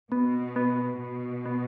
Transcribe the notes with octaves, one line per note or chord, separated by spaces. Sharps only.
B2 B3
B3
B2
B3